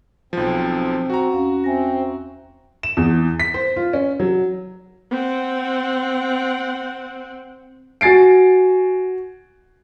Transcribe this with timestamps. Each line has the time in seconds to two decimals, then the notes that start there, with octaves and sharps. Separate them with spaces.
0.33 B1 F3 C4
1.10 F#4 A#5
1.33 E2 C#4 F5
1.64 C4 E5 G#5 A#6
2.83 E7
2.97 E2
3.40 B6
3.54 C5
3.76 F4
3.93 C#4
4.20 F#3
5.11 C4 F#5
8.01 F#4 G#5 A6 C7 D7